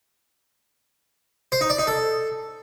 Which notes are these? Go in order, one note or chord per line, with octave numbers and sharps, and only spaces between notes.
C5
D#4
D5
D#4
A4